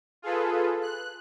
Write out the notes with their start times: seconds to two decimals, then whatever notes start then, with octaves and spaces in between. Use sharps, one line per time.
0.22 F4 G#4 A4 B4
0.81 F#6